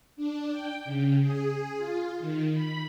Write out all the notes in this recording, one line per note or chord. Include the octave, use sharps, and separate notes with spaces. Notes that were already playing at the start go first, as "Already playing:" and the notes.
D4
G5
C#3
G#4
F4
D#3
B5